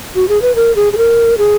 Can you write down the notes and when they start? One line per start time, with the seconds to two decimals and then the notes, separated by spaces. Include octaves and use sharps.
0.15 F#4
0.29 G#4
0.42 B4
0.56 A#4
0.76 G#4
0.93 G#4
0.98 A#4
1.38 G#4